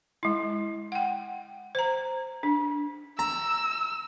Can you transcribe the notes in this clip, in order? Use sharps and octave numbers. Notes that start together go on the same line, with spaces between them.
G#3 E4
F#5 G5
C5 A#5
D4
A#5 E6